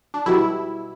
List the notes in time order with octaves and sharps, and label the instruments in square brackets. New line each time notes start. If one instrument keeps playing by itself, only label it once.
[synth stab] D4
B1 B2 G3 E4